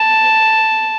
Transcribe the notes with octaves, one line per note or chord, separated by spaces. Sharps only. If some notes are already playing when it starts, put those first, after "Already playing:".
Already playing: A5